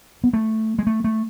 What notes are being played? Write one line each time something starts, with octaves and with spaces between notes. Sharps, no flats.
B3
A3
G#3
A3
A3